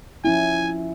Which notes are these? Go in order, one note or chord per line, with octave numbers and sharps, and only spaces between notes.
F3 C#4 E4 G#5